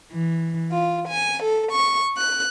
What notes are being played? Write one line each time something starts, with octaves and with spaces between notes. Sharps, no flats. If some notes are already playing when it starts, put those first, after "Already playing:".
E3
F4
G#5
A4
C#6
F#6